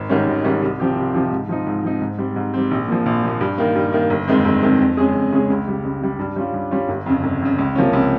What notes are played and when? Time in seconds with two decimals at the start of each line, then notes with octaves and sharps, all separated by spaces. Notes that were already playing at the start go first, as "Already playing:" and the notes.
Already playing: G#1
0.09 G#2 D#3 G3 C#4
0.27 G#1
0.44 G#2 D#3 G3 C#4
0.62 C2
0.80 C3 F3 C4 G4
0.97 C2
1.14 C3 F3 C4 G4
1.32 G#2
1.49 F3 C4 D#4
1.67 G#2
1.84 F3 C4 D#4
2.02 G#2
2.19 G3 C4
2.36 G#2
2.54 G3 C4
2.71 A#1
2.88 A#2 F3
3.06 A#1
3.23 A#2 F3
3.41 G2
3.58 D#3 A#3
3.75 G2
3.93 D#3 A#3
4.10 G1
4.28 F2 D#3 G#3 C4
4.45 G1
4.63 F2 D#3 G#3 C4
4.80 F2
4.97 C#3 G#3 C#4 G#4
5.15 F2
5.32 C#3 G#3 C#4 G#4
5.50 C#2
5.67 C#3 G3
5.85 C#2
6.01 C#3 G3
6.19 G2
6.36 G3 C#4 F4
6.54 G2
6.71 G3 C#4 F4
6.89 G1
7.06 F2 C#3
7.24 G1
7.41 F2 C#3
7.58 C#2
7.75 C3 F3 A#3 C#4
7.93 C#2